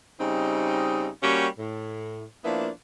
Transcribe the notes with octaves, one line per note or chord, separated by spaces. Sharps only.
C#3 G3 C4 D#4
G3 A#3 C#4 F#4 G4
A2
F3 A#3 B3 D4 E4